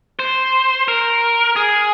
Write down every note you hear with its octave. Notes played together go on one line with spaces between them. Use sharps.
C5
A#4
G#4